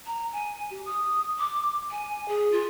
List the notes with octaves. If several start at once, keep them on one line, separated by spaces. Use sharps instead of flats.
A#5
G#5
G4
D#6
D6
G#5
G#4
F4